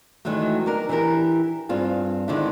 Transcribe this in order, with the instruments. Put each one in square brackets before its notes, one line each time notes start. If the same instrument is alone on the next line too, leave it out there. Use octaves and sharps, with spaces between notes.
[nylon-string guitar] D#3 E3 F#3 G#3 A3
D4 A#4
E3 E4 G4 A#4
G2 C4 F4 G#4
D3 D#3 G#3 C4 D4 E4